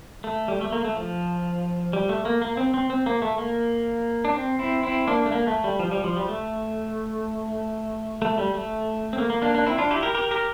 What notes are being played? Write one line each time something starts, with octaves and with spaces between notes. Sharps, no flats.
A3
G3
A3
A#3
A3
F3
G3
A3
A#3
A#3
C4
C4
C4
A#3
A3
A#3
D4
C4
C4 E4
C4 E4
A#3 D4
A3
A#3
A3
G3
F3
G3
F3
G3
A3
A3
G3
A3
C4
A#3
A#3
A#3 D4
A#3 D4
C4 E4
D4 F4
E4 G4
G4 A#4
G4 A#4
G4 A#4